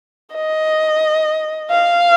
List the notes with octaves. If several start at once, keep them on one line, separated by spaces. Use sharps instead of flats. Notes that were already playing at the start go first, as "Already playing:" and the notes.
D#5
F5